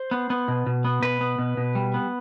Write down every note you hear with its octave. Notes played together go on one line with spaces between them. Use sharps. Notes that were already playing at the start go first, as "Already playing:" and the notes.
Already playing: C5
B3
B3
B2
B2
B3
B2 B4
B3
B2
B2
G3
B3